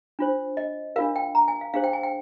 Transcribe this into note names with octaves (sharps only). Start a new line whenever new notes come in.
D4 F4 C5
D#5
D4 F4 A#4 F5
G5
A#5
G#5
F5
D4 G#4 C5 F5
G5
G#5
G5